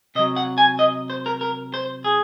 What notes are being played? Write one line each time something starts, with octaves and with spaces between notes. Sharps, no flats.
C3 F#3 D#5
F#5
G#5
D#5
C5
A#4
A#4
C5
G#4